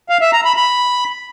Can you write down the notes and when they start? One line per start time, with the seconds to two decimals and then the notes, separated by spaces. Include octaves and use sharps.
0.09 F5
0.21 E5
0.33 A#5
0.45 B5
0.57 B5